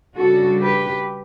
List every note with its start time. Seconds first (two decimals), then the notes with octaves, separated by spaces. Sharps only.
0.16 C#3 G3 D4 F#4 A4
0.60 G4 B4